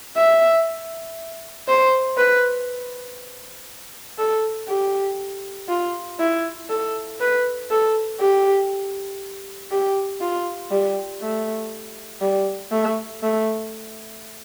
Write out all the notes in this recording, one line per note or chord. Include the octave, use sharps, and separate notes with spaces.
E5
C5
B4
A4
G4
F4
E4
A4
B4
A4
G4
G4
F4
G3
A3
G3
A3
A3